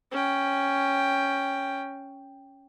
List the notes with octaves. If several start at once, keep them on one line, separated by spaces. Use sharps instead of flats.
C#4 G5